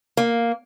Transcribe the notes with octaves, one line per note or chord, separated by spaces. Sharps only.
A#3